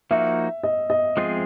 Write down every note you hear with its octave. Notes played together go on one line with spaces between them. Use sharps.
F3 A#3 D#4 F#4 E5
D#5
D#5
F3 G#3 C4 F4 G#4